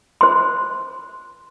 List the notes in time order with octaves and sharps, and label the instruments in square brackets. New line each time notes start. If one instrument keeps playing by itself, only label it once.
[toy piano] C5 C6